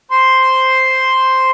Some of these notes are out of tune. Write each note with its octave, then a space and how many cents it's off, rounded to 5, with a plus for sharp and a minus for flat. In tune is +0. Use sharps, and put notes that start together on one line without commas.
C5 +0 C6 +0